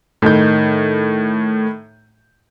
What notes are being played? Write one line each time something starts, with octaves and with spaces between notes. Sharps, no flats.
A2 D#3 G6